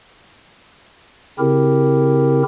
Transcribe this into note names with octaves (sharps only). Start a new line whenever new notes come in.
C#3 C4 E4 G4 A#4